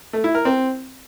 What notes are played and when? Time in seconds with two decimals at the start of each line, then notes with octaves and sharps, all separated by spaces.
0.13 A3
0.24 E4
0.35 A#4
0.45 C4